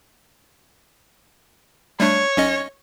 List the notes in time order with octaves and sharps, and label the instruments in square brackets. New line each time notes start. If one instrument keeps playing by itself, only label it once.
[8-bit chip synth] G3 A3 D4 [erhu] C#5
[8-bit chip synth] B1 C#4 D#5